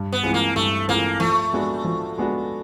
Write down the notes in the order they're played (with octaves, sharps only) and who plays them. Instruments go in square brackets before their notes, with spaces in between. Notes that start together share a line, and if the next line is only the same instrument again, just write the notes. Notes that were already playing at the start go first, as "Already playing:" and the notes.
Already playing: [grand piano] G2
[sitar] B3
[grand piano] E3 G#3 C4 F4
[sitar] A#3
[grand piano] G2 [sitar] A3
[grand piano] E3 G#3 C4 F4 [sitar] A#3
[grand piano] F3 [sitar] A3
[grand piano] G#3 B3 D4 F#4
F3
G#3 B3 D4 F#4